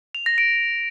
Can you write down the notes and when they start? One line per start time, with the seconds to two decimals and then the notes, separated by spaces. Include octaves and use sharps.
0.15 F7
0.26 A#6
0.38 D7